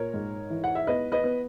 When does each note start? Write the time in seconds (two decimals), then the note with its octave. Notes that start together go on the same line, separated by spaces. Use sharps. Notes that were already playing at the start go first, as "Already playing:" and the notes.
Already playing: A#2 A#4 C#5
0.14 G#2
0.50 E3
0.64 F#5
0.75 E5
0.87 B3 B4 D#5
1.12 B4 D#5
1.24 B3